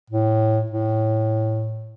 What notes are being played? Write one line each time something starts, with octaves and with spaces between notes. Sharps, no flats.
A2
A2